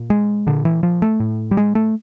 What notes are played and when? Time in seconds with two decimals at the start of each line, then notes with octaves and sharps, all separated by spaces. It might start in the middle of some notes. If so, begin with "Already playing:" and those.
Already playing: A#2
0.10 G#3
0.47 A#2 D3
0.65 E3
0.83 F3
1.02 A3
1.20 A2
1.51 G3
1.57 G#3
1.75 A3